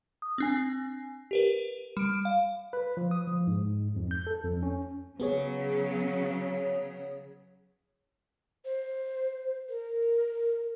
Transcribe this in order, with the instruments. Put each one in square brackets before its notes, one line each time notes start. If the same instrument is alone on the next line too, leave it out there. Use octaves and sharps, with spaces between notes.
[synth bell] D#6
C4 D4 G#5
G4 A#4 B4
G3 D7
F5
[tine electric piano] B4
F3
D#6
F3
G#2
F2
G6
A4
F2
C#4
[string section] C#3 F#3 [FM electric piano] B3 G#4 C#5
[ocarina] C5
A#4